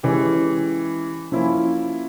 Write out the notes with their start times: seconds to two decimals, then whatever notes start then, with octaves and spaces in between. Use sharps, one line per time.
0.03 E3 G#3 C#4 E4 G4
1.32 F3 A#3 C#4 E4